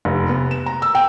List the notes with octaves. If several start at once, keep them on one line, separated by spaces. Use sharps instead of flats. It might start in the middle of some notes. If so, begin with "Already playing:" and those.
F1
B3
E7
A#5
E6
G5